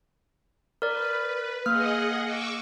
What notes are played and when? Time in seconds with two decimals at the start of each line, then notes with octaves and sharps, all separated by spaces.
0.82 A#4 B4 D5
1.66 A#3 G#4 D#5 F#5 F6
2.24 C#6 D6 E6